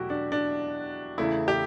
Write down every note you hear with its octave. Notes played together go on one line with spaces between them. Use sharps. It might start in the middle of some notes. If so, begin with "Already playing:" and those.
Already playing: E2 B2 F#3 A3 E4 F#4 G4
D4
D4
E2 C#3 E3 A3 E4
G4